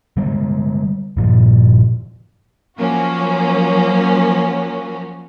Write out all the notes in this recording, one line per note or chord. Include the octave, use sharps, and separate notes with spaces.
D3 G3 G#3
G2 A#2 F3
F3 F#3 A#3 C#4 F#4